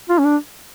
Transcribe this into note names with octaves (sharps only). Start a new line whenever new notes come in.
F4
C#4
D4